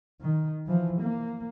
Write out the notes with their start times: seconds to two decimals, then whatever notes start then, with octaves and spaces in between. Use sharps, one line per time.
0.21 D#3
0.66 E3 F3
1.01 A#3